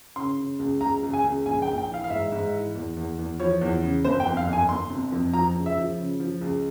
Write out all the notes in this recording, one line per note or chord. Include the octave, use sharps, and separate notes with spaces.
C#3 C6
C#3
C#2
C#2 A#5
C#2
G#5
C#2
A#1 G#5
G5
A#1
G5
E3
F5
F5
G#2 E5
G#2
E3
E2
E2
E2
F3 C#5
E2
C#3
G1 C5
G5
F2
F5
G1
G#5
G1 C6
C3
F2
F3 A#5
C#2
E5
F3
C#3
F3
C#2